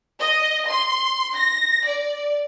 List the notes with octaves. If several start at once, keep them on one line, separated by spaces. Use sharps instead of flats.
D#5
C6
A#6
D5